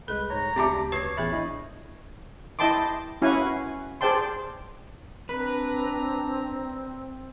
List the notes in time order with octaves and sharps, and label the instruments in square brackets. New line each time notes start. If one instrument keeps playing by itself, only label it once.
[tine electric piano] C2 G#3 [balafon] A4 [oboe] B4
[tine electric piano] G#2 C#5 [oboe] A#5
[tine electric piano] D2 C#3 [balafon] C4 D5 E5 [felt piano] G4 A5 D6
[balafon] F#4 B4 [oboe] C#5 [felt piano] C7
[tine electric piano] A1 B5 A6 [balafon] B3 G#4 E5
[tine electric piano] D4 E4 D#5
[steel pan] E4 D#5 G5 A5 C6 D6
C#4 E4 F#4 F5 F#5 G#5
G#4 C5 D5 G5 A5 C6
[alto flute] C4 [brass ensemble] D4 A#5 [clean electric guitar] B4